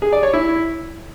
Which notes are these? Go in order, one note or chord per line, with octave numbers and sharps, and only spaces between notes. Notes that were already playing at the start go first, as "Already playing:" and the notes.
G#4
D5
C#5
E4